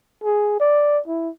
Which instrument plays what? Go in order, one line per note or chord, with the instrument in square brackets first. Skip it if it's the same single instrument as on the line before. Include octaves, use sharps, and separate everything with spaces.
[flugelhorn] G#4
D5
E4